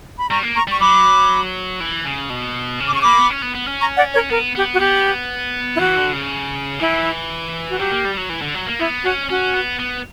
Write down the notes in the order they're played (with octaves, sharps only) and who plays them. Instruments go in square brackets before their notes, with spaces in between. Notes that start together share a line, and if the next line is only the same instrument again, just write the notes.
[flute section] B5
[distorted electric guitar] G3 [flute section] A#5 C#6
[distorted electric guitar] A#3
[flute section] A#5 C#6
[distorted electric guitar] G3 [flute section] C#6
[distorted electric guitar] F#3 [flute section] B5 D6
[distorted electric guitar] E3
C#3
B2
C#3
[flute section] D6
[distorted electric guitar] C#3 [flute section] C#6
[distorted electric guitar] A#3 [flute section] B5 D6
[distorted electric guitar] B3
C#4
B3
B3
C#4
[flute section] A#5 C#6
D5 F#5
A#4 C#5
[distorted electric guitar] B3 [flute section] A#4
[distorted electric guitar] B3 [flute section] G4
[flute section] F#4
[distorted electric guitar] B3 [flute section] G4
[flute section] E4
[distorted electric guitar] E3 [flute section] F#4
[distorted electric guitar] D3
C#3
[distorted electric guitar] E3 [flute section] E4
[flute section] F#4
[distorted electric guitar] F#3 [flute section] G4
[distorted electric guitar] A#3
G3
F#3
E3
D3
F#3
A#3
[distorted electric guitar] B3 [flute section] E4
[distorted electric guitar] C#4 [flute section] F#4
[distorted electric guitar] C#4 [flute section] F#4
[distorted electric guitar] B3
B3